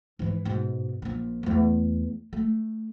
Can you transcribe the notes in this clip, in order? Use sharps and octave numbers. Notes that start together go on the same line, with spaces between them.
G#2 E3
G#2 B2
A#1 A#2
E2 A3
A3